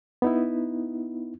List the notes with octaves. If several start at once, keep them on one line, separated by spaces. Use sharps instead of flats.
B3 D#4 E4